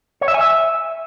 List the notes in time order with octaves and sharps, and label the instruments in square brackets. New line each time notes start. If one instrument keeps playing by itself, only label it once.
[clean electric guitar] C#5
E5
G#5
E5